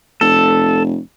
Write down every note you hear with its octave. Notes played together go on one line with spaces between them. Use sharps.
F1 A4